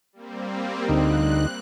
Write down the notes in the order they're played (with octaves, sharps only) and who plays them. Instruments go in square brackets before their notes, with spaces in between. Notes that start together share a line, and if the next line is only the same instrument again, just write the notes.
[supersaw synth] G3 A#3 C4
[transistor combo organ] D2 D#4 [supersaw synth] F#6